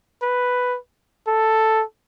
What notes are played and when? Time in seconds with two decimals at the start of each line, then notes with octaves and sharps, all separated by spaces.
0.22 B4
1.27 A4